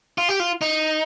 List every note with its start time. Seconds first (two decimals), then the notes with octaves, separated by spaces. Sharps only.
0.18 F4
0.29 G4
0.40 F4
0.61 D#4